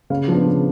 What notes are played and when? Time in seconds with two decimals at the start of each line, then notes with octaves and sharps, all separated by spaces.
0.10 C#3 F5
0.28 F3 B3 D4
0.46 C#3